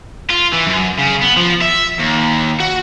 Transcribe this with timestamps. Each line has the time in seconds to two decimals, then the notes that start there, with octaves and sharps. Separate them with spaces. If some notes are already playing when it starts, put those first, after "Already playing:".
0.30 F4
0.53 E3
0.66 F#2
0.99 C#3
1.22 B3
1.37 F3
1.62 E5
1.99 D#2
2.60 F#4